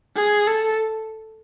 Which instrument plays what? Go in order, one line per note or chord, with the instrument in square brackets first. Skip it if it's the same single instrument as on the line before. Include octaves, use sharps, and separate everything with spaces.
[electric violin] G#4
A4